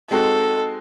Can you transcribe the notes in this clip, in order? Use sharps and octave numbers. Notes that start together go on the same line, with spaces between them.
G#3 C4 D#4 F#4 A4